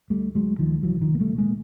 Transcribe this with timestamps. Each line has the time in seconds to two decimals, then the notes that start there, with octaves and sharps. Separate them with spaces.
0.10 D2 G3 A3
0.35 D2 F#3 G#3
0.59 D2 D#3 F3
0.83 C2 E3 F#3
1.01 D#3 F3
1.07 C2
1.14 A#3
1.19 G3 A3
1.32 A#2
1.38 G#3 A#3